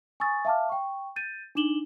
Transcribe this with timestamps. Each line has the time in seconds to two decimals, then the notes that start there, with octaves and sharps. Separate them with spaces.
0.20 G#5 C#6 D#6 E6 A6
0.45 E5 F5 A5 D6 F6
0.69 G5 C#6
1.16 G6 A6 D#7
1.55 D4 D#4 D6 E7 F#7 G7